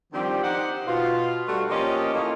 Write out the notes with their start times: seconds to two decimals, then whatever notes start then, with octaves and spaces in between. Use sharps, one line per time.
0.13 D#3 F3 G3 C4 D4 G4
0.43 D#4 G4 C5 F#5
0.87 B2 F4
1.48 G3 A3 D4 F#4
1.70 F3 A#3 C#4 F4 G4 D#5
2.14 E3 A3 A#3 D#4 F4